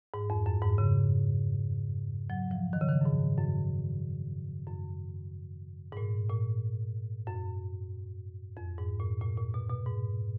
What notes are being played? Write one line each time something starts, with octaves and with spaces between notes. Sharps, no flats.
G#2
F2
F#2
G#2
C#3
F#3
F3
D#3
C#3
D#3
F#2
G#2
F#2
F#2
G#2
A#2
A#2
F#2
F2
G#2
A#2
A#2
A#2
B2
B2
G#2